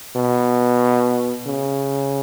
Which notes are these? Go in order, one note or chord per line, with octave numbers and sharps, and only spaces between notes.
B2
C#3